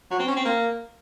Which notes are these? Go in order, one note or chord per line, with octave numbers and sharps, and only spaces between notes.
F#3
C4
C#4
C4
A#3